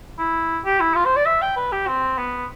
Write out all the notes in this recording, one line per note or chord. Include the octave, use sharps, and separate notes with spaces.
E4
G4
E4
F4
C5
D5
E5
G5
B4
G4
C4
B3